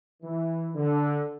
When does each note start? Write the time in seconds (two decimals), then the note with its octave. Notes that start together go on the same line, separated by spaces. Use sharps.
0.22 E3
0.74 D3